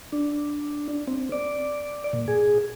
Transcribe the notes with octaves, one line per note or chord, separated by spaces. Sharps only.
D4
C4
D5
A#2
G#4